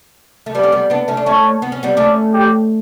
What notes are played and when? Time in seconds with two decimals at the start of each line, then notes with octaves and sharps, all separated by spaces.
0.46 A3
0.55 G3 B3 D5
0.64 C#4
0.72 G3 B3
0.90 B3 D4
1.08 A3 C#4
1.17 D4
1.26 A3 C#4 C#5
1.62 B3
1.72 C#4
1.83 G3 B3
1.97 A3 C#4 D5
2.33 G4